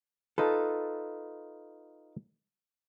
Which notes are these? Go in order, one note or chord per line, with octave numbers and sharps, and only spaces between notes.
D#4 F4 A4 B4